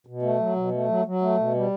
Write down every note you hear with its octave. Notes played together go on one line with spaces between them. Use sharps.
B2
A3
F#3
B2
A3
F#3
F#3
A3
B2
G3